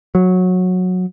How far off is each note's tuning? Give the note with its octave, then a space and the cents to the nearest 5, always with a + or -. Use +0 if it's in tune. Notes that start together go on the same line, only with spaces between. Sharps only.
F#3 -15